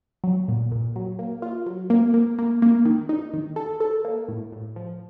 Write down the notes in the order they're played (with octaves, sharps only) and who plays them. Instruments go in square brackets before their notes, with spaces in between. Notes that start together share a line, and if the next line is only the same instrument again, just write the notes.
[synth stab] F#3
A#2
A#2
F#3
A#3
F4
F#3
A#3
A#3
A#3
A#3
D#3
D#4
D#3
A4
A4
A#3
A2
A2
F3